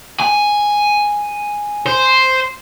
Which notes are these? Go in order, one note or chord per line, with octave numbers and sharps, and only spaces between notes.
G#5
C5